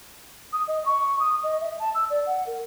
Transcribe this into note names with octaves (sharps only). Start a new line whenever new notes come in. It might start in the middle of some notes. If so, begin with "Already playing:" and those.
D#6
D#5
C#6
D#6
D#5
E5
A5
E6
D5
F#5
A#4